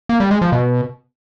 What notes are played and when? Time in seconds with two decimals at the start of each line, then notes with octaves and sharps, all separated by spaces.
0.09 A#3
0.20 G3
0.31 G#3
0.42 F3
0.52 B2